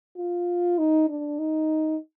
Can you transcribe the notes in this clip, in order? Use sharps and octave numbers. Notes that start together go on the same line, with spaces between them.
F4
D#4
D4
D#4